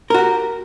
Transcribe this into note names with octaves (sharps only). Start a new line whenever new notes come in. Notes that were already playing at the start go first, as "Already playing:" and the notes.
F#4 G4 A#4